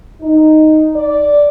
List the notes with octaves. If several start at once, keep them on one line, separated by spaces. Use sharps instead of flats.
D#4
D5